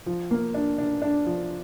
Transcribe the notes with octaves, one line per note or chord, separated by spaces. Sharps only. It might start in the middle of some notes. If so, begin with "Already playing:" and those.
F3
A#3
D4
D4
D4
F3